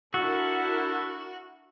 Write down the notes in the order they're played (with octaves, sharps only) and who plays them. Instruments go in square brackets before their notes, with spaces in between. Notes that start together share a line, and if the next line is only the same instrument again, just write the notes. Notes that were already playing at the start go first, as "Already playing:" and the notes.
[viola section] D4 E4 A#4 [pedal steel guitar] F#4 [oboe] A4